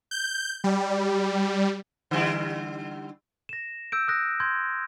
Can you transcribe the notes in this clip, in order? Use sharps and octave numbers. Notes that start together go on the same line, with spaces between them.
G6
G3
D3 G3 E4
A#6 E7
E6 G6 D7
D#6 F#6 A#6
C6 G6 G#6